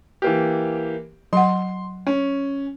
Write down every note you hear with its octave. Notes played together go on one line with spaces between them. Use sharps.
E3 A#3 G4
F#3 F#5 C6
C#4